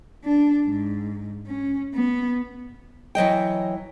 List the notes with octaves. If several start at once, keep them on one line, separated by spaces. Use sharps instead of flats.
D4
G#2
C#4
B3
E3 F#3 D#5 G5